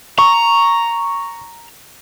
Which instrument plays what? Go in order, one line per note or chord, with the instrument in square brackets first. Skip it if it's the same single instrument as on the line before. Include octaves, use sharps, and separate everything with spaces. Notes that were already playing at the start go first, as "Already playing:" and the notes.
[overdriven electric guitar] A#5 [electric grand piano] C#6